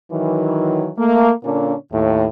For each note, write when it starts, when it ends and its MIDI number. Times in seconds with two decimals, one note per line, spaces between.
0.11 0.90 51
0.11 0.90 52
0.11 0.90 54
0.98 1.31 57
0.98 1.31 58
1.44 1.74 46
1.44 1.74 50
1.44 1.74 58
1.44 1.74 61
1.44 1.74 62
1.92 2.25 39
1.92 2.25 45